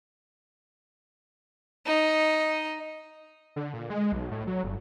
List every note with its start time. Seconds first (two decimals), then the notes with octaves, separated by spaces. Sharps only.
1.86 D#4
3.56 D3
3.73 A#2
3.90 G#3
4.12 B1
4.31 A2
4.47 F#3
4.64 G1